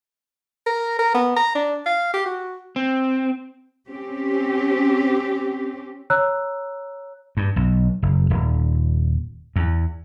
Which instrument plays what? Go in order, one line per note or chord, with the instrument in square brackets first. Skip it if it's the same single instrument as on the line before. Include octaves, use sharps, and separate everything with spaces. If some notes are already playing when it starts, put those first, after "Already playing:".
[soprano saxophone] A#4
A#4
B3
A#5
D4
F5
G4
F#4
[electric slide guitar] C4
[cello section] C4 C#4 G4
[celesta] C#5 A#5 E6 F#6
[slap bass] G2
B1
F#1
D#1
E2